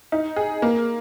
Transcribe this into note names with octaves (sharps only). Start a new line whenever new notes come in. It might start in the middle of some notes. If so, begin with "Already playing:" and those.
D#4
G#4
A#3